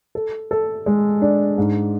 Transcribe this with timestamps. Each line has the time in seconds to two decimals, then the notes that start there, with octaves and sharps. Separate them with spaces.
0.15 A4
0.51 A4
0.86 G#3
1.22 D4
1.58 G#2